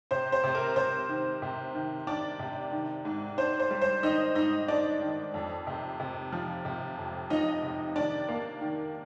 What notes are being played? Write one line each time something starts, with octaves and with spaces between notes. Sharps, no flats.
C3 C5
C5
C3
A#4
C3 C5
D#3
C3
D#3
D#3 D4 D5
C3
D#3
G#2
D4 C5
C5
G3
C5
D#3 D#4 D#5
G#2 D#4 D#5
D4 D5
D#3
F2
C3
C3
F3
C3
F2
F3 D#4 D#5
C3
D#3 D4 D5
A#3
D#3